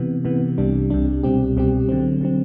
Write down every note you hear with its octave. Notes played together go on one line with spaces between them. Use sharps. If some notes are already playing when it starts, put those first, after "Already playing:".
Already playing: C3 E3 B3
C3 E3 B3
C2 C3 G3 D4
C2 C3 G3 D4
C2 B2 G3 C4 G4
C2 B2 G3 C4 G4
D3 F#3 C4
D3 F#3 C4